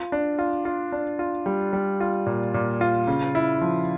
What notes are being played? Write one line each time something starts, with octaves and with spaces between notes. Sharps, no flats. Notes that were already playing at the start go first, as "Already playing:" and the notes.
Already playing: F4
D4
F4
F4
D4
F4
G3
G3
F4
A#2
A#2
F4
C#3
E4
F3